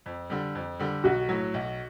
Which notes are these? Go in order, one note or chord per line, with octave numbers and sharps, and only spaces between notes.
F2
D3 G3
F2
D3 G3
B1 F#4
A2 F#3
B1